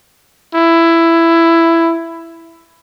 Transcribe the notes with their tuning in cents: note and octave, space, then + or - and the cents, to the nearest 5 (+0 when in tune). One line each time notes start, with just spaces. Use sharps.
E4 +10